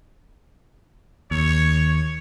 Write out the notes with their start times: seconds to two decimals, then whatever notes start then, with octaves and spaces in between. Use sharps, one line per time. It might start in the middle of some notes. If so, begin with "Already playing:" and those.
1.31 D#2 C#5